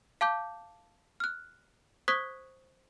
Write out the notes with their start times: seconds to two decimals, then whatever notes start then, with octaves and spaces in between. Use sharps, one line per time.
0.21 F5 A5 D6 G6
1.20 F6 F#6
2.08 C5 C#6 D#6 F#6 G#6 B6